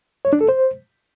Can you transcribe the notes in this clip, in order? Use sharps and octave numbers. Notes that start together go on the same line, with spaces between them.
C#5
D4
A4
C5